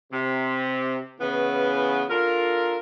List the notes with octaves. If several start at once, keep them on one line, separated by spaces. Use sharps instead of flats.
C3
C#3 E3 B3
D4 F4 A4 A#4